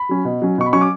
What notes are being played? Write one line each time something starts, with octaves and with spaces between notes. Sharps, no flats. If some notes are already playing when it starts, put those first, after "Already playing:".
Already playing: B5
F#3 C#4
B2
F#3 C#4
B2 C#6
B5
F#3 C#4 C#6
D6